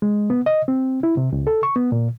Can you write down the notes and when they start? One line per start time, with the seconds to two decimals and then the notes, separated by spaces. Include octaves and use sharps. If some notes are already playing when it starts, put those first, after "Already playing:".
0.02 G#3
0.30 B3
0.46 D#5
0.68 C4
1.03 E4
1.17 C3
1.33 C#2
1.47 A4
1.63 C#6
1.76 B3
1.92 A#2